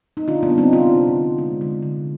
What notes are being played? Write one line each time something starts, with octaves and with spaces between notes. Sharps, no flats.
D#4
D3 D4 F4
B3 D4
G3
C4 D#4
C3 D4 F4
C3
D3
G#3
D3
D3